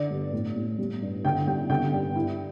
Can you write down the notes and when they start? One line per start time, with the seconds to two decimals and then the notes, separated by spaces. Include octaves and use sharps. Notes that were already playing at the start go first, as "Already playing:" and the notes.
Already playing: D3 D5
0.10 G2
0.33 A2
0.55 A2
0.79 G3
1.02 G2
1.25 D3 G5
1.47 G3 G5
1.70 D3 G5
1.93 G2
2.15 E4